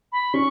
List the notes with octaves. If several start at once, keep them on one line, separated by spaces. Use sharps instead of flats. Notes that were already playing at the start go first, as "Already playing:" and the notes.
B5
C#4 C#6